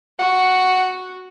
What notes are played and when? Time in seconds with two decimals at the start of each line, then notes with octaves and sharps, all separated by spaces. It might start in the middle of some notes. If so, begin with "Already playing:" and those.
0.19 F#4 F#5